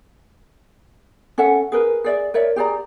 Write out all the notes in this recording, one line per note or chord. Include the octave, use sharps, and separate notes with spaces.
C#4 A4 E5 F#5
G#4 A#4 B4
G#4 D5 E5
A#4 C#5 D5 E5
G4 G#4 D5 A#5